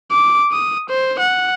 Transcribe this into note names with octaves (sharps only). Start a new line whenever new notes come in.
D6
D#6
C5
F#5